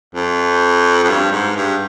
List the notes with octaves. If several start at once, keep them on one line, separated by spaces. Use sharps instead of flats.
F2
F2
G2
G#2
G2